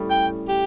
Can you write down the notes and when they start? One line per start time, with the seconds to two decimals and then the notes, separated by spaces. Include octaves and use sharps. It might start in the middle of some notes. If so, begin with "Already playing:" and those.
Already playing: A2 G3 C#4
0.10 G5
0.48 G4